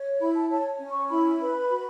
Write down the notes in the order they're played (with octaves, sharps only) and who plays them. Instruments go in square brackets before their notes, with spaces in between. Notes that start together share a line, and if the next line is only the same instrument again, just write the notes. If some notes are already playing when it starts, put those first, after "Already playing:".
Already playing: [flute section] C#5
E4 B5
A5
C#5 A5
C#4
C#6
E4 B5
B4
F#4